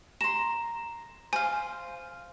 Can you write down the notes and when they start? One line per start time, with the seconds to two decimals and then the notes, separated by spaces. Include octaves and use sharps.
0.21 A#5 C6 E7
1.33 C5 F5 G#5